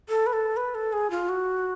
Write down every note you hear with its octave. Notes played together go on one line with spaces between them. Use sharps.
A4
B4
A4
B4
A4
G#4
F4
F#4